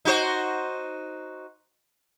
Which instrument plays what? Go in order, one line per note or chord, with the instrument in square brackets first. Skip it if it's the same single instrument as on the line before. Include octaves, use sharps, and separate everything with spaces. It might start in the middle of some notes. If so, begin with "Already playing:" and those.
[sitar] D#4 F#4 C5